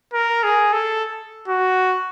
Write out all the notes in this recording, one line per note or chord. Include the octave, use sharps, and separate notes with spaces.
A#4
G#4
A4
F#4